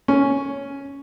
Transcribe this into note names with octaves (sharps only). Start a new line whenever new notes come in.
C#4